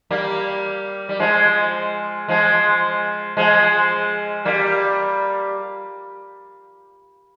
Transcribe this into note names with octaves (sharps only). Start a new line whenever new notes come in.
G3 A#3
G3
F3 G#3
F3 G#3
F3 G#3
G3 A#3